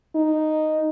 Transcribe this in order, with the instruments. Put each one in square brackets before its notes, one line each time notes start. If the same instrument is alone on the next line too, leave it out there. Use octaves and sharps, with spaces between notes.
[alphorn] D#4